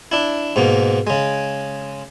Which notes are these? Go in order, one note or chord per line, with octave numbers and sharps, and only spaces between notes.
D4 E4
G#2 B2 A#3
C#3 G#3